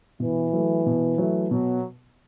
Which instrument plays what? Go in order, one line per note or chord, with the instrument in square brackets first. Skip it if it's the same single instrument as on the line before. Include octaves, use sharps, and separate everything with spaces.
[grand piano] B2 [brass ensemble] E3
[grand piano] F#3 A3
B2
F#3 A3
[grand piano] B2 [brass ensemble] F#3